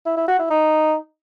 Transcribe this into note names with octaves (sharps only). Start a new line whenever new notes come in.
E4
E4
F#4
E4
D#4